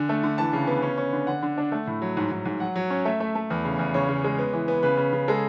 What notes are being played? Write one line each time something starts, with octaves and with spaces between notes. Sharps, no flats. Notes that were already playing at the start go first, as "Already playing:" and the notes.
Already playing: D3 G#5
A3
D3
E3 A5
C#3
B3
C#4
C#4
D3
D3 F#5
D3
D4
A3
A2
F#3
G#2
G#2
G#2
F#3 F#5
F#3
C#4
A3 E5
A3 E5
A3
E2
C#3
E2
C#3 C#5
C#3
G#3
B3
E3
B3
C#3 B4
C#3
C#3
G#3 A4